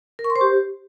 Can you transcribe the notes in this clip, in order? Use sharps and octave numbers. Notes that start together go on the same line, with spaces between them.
A#4
C#6
C6
C5
G4